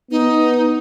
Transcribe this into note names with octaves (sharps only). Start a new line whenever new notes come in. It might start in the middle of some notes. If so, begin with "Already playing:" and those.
B3 D#4